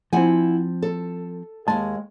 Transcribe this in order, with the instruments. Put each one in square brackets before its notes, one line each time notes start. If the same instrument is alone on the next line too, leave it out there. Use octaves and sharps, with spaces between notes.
[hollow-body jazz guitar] F3 C4 [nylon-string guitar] E4 F#5 G#5
[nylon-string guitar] A4
[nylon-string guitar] D#2 G#3 [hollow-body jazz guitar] A5